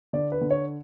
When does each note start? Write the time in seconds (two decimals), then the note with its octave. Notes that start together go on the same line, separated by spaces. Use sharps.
0.13 D3 D5
0.32 B4
0.41 D3
0.51 C#5